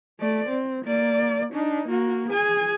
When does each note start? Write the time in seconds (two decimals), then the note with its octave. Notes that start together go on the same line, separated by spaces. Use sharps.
0.20 A3 D5
0.49 C4
0.85 A#3 D5
1.53 D4 D#4
1.88 A#3 F#4
2.29 G#4 G#5